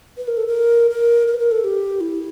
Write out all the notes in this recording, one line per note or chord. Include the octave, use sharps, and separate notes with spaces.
B4
A#4
A4
A#4
A#4
A#4
B4
A#4
A4
G4
E4